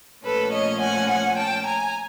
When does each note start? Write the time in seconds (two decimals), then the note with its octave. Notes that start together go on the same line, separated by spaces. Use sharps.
0.24 A#2 F3 A3 C#4 A4 B4
0.53 C#5 D#5
0.81 F#5 G#5
1.10 F#5 G#5
1.37 G5 A5
1.66 G#5 A#5